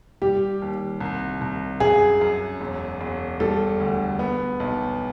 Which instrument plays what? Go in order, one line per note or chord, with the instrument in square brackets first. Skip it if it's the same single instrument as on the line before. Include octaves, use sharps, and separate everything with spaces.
[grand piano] G3 [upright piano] G4
[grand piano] D#2
C2
C2
[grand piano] F#2 [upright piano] G#4
[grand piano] F#2
E1
E1
[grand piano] G3 [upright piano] A4
[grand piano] D2
B3
B1